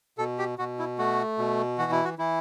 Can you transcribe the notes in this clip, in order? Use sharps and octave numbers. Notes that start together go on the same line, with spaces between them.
B2 A4
G4
B2 F#4
E4
A3 F#4
B2
E3 F#4
E4
F#4
E3 E4